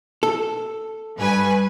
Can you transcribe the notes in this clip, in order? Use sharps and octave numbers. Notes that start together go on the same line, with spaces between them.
A4
G2 B4 G#5